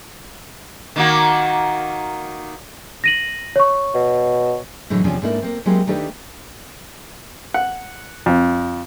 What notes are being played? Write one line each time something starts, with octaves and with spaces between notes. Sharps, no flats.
D#3 A#3 F#4
A#6 D#7 F#7
C#5 C#6
B2
A2 D3 E3 F#3 G#3
E2 C3 F3 C#4 D4
G#2 A3 A#3 D4 E4
A#3 C4
F#3 G#3 A#3 C4 E4 G4
D#3 A3 D4 G4 B4
F#5
F2